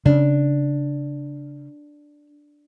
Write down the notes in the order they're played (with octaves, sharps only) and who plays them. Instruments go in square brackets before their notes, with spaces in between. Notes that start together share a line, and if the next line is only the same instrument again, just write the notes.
[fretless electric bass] C#3 [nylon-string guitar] D4